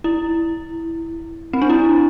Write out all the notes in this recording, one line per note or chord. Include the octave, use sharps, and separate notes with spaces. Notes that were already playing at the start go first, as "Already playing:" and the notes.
E4
C4
D4
E4